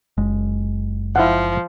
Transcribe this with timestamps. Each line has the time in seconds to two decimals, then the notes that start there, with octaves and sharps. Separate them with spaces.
0.18 F#1 G#3
1.16 F3 E4 F5 F#5